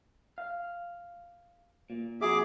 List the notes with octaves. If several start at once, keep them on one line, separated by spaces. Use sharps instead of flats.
F5
A#2
F2 F#4 G#4 E5 D6